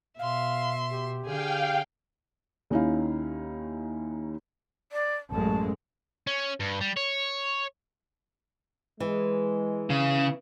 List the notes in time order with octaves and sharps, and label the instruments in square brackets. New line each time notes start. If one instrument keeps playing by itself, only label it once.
[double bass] B2 [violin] E5 C6 [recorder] F5
[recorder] G4
[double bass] D3 [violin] G#4 [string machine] F5 G5
[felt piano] D#2 C#4 D#4 E4 F5
[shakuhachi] D5
[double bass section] A1 F#2 G#3 [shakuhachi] A5
[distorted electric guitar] C#4
G2
G3
C#5
[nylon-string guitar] E3 [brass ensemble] G#3
[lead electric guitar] C#3